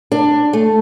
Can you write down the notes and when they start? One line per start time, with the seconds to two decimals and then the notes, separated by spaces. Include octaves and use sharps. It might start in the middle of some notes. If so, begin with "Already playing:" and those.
0.12 D4
0.53 A3